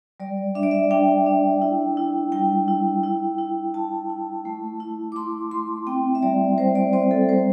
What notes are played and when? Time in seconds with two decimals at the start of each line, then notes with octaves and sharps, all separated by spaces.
0.20 G3 D5
0.55 D4 E5
0.63 D5
0.71 E5
0.91 D4 G5
1.26 D4
1.62 E4
1.97 E4
2.32 G3 G5
2.68 E4
3.03 E4
3.38 E4
3.74 E4 A5
4.10 E4
4.45 A3
4.80 E4
5.12 D6
5.16 E4 C6
5.51 A3 C6
5.87 C4 G5
6.15 E5
6.23 G3 D5
6.58 G3 C5
6.75 D5
6.93 C4 C5
7.11 A4
7.29 G3 C5